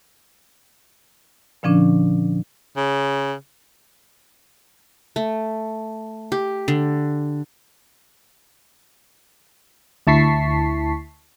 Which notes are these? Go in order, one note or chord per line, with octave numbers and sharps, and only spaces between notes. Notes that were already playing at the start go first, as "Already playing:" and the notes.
A#2 D3 F3 C#4 D4
C#3
A3
G4
D3
D2 E4 A5 C#6 B6 C7